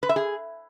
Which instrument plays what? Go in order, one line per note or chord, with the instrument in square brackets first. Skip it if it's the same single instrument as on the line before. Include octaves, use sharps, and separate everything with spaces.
[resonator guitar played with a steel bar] B4
E5
G#4